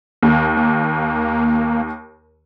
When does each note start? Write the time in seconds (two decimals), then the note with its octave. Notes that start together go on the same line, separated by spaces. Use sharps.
0.23 D#2 A#3
0.57 A#3